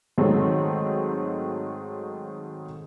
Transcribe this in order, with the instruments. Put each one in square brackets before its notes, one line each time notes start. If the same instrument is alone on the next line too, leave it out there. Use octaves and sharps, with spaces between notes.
[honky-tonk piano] G#2 D#3 F#3 G#3 A3 C4